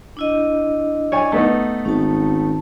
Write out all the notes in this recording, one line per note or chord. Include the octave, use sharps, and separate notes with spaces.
D4 E4 D#5
C#5 D5 G#5
A3 B3 D#4
G#1 C#4 A5